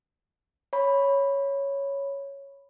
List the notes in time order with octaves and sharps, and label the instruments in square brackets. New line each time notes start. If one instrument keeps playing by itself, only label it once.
[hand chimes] C#5 B5